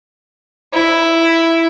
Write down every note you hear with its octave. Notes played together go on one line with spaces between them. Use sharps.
E4